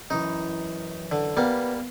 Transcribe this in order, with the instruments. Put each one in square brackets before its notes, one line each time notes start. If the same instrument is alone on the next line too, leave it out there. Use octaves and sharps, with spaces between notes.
[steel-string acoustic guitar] F#2 E3 [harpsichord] D#4
[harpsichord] D3
[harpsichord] G3 A#3 [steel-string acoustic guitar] B3